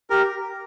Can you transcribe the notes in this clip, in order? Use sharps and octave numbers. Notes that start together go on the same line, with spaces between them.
G4 A#4